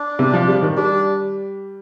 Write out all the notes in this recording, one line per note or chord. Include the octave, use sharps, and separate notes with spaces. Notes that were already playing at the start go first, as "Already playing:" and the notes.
Already playing: D4
C3
F3
G3
D#3
G3 D4